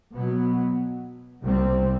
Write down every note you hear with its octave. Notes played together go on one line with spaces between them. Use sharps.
B2 F#3 B3
C2 C3 G3 C4